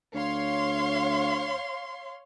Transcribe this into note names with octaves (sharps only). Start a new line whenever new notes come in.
D2 C#5 F5 C6